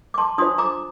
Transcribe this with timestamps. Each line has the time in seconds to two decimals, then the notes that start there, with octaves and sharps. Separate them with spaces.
0.14 D6
0.18 A5 C6
0.38 D4 F4 C5 C6 D#6
0.58 A#5 D6